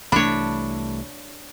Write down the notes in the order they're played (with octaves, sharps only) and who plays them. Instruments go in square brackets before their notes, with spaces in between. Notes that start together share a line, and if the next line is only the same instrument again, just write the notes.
[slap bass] C2 E3 A3 [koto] D4 C#5 [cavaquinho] B5